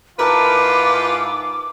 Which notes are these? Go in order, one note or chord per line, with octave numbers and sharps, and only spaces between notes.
G#2 E4 F4 A#4 B4 A5 D6